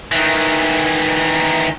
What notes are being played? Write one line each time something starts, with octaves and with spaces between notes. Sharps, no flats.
D#3 E3